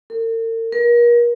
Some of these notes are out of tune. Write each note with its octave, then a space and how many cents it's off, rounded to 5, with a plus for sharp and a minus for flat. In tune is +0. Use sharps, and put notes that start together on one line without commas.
A#4 -45
A#4 +35